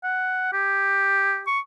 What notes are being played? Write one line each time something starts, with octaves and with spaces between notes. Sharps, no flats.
F#5
G4
C#6